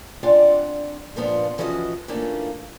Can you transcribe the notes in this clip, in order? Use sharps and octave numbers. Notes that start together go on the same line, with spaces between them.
C4 D4 F4 D5 F#5 G#5
G2 A#2 F3 B3 D4 F4
E3 F3 C#4 F#4 C#5 D#5
E3 A3 A#3 C#4 D4 F4